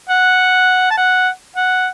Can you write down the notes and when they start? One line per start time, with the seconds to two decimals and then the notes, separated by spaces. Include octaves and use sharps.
0.09 F#5
0.90 A5
0.97 F#5
1.56 F#5